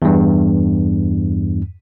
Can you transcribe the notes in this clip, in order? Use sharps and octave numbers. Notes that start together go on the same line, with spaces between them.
E2 G2